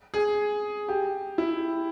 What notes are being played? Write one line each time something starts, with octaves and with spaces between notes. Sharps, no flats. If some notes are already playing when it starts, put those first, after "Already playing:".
G#4
G4
E4